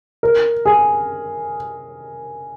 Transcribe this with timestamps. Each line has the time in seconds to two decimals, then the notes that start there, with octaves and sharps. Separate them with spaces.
0.23 A#4
0.66 G#4